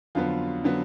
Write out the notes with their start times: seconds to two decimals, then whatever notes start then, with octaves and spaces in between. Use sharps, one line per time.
0.15 F2 D3 F#3 B3 F4
0.64 D3 F#3 B3